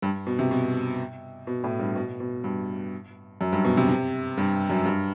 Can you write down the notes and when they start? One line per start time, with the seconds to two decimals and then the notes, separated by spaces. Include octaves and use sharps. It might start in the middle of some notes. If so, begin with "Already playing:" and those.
0.02 G2
0.27 B2
0.39 C3
0.51 B2
1.47 B2
1.64 A2
1.79 G2
1.96 B2
2.20 B2
2.44 G2
3.41 F#2
3.53 G2
3.65 B2
3.77 C3
3.89 C3
4.38 G2
4.70 F#2
4.86 G2